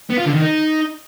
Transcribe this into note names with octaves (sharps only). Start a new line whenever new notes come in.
B3
F4
D3
D#3
D#4